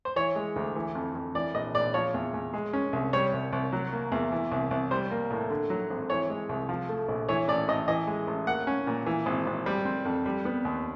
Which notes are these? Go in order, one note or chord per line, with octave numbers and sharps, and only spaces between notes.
C5
E3 C#5
G#3
D2
E3
F2
F2
E3 D5
A#1 D#5
A#1 D5
F3 C#5
E2
E2
G#3
C#4
C2
G3 C#5
C2
C2
F#3
A#3
E2
E3
C2
C2
G3 C5
A#3
A2
D3
F#3
G#1
E3 C#5
G#3
C2
F3
A3
A#1
E3 C#5
A1 D5
A1 D#5
E3 D#5
G#3
A1
A#3 F#5
C#4
A#2
E3
G#1
G#1
G3
C4
F2
G3
B3
D#2